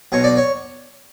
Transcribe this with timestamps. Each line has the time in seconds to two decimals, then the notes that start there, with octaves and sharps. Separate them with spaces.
0.12 B1 B2 C#5
0.24 D5
0.37 C#5